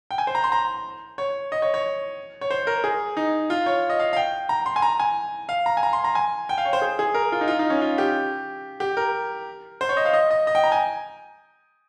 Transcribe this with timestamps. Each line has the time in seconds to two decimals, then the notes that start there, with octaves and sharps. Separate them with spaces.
0.11 G5
0.18 G#5
0.27 C5
0.35 A#5
0.44 C6
0.52 A#5
1.18 C#5
1.52 D#5
1.62 C#5
1.74 C#5
2.41 C#5
2.51 C5
2.67 A#4
2.84 G#4
3.17 D#4
3.50 F4
3.66 C#5
3.90 D#5
3.99 F5
4.13 F5
4.17 G5
4.49 A#5
4.66 C6
4.76 G#5
4.82 A#5
5.00 G#5
5.49 F5
5.66 A#5
5.77 G#5
5.83 A#5
5.93 C6
6.04 A#5
6.15 G#5
6.49 G5
6.58 F5
6.65 C#5
6.73 C5
6.82 G#4
6.99 G#4
7.14 A#4
7.32 F4
7.41 D#4
7.48 F4
7.59 D#4
7.70 C#4
7.81 F4
7.98 G4
8.80 G4
8.97 A#4
9.81 C5
9.89 C#5
9.97 D#5
10.05 F5
10.13 D#5
10.31 D#5
10.47 D#5
10.55 G5
10.64 A#5
10.72 G#5